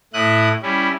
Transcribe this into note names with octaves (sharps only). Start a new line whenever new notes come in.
A2 E4 D#6 F#6
G3 C#4 E4